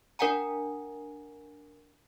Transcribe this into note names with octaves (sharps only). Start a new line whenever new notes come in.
D4 A#4 D5 F#5 G#5 A#5